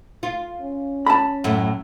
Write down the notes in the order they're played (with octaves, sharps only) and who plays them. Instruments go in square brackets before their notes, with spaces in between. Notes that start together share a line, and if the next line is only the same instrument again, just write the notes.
[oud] F4
[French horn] C#4
[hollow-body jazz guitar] A5 B5
[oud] F#2 A2